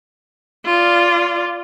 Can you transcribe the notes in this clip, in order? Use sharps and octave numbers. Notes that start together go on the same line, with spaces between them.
F4 D5